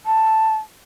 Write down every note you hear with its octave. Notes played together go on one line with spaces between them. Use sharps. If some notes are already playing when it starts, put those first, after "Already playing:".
A5